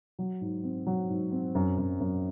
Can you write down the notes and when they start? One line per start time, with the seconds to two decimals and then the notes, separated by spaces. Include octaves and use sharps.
0.19 F#3
0.41 G#2
0.64 C4
0.87 F#3
1.09 G#2
1.32 C4
1.55 F#2
1.78 F#2
2.00 F#2